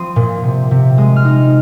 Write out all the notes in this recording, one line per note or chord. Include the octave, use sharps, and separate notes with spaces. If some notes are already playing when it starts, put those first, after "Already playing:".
Already playing: F3 C4 C6 D#6
A#2
C3
C3
G#3 D#6
F6
D#4 D#6